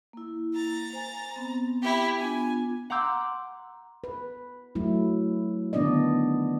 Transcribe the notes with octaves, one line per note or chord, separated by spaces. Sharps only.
A#3 E4
A#5 A6
C5 G#5
B3 C4
E4 G4
B3 D4 F4 G#5
F#5 A#5 C6 D6 E6 G6
B4
F#3 A3 E4
D3 D#3 B3 D4 D5 D#5